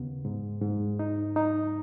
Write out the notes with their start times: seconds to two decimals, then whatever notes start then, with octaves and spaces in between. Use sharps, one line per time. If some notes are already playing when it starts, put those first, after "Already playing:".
Already playing: D#2 C#3 B3
0.25 G#2
0.62 G#2
0.99 D#4
1.36 D#4